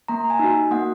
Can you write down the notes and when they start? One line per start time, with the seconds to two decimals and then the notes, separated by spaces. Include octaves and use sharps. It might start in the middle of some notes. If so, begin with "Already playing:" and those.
0.08 A#3 A#5
0.30 G#5
0.39 D#4 F#4
0.71 A#3 F#5